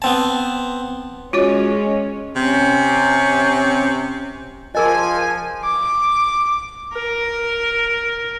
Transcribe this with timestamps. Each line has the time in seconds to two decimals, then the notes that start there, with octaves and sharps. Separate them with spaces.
0.02 B3 C4 A5
1.33 G#3 C#4 F4 F#4 C#5
2.35 C3 C#4
4.75 F3 G#4 A#4 D#5 G#5
5.64 D6
6.93 A#4